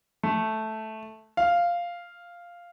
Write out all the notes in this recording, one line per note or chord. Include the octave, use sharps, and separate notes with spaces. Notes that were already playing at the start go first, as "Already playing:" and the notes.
A3
F5